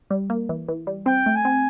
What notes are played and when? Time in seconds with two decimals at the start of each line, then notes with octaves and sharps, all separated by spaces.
0.10 G3
0.30 A#3
0.49 E3
0.69 E3
0.87 G3
1.06 C4 G5
1.26 A3
1.36 G#5
1.45 C4